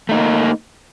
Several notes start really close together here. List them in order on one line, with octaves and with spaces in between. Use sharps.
A3 D#4 A#3